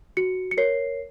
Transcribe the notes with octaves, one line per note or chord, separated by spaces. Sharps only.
F#4 C#7
C#7
A#4 C#5 C7